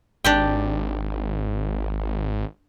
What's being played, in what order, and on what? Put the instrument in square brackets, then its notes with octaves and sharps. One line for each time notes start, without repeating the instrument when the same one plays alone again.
[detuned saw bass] G#1 [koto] D4 G4 G5